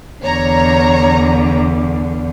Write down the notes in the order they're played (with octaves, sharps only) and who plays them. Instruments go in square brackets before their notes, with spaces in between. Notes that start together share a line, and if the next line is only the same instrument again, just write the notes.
[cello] E2 D3 [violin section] C#5 A#5